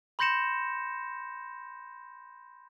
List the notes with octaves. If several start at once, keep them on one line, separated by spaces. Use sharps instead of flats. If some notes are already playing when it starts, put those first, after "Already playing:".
B5 C6 G6 A#6 C#7 E7